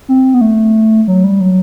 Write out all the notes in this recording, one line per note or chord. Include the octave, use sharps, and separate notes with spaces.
C4
B3
A3
F#3
G3
F#3